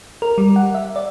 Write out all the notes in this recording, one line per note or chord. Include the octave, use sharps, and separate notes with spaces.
A#4
G3
F#5
E5
D5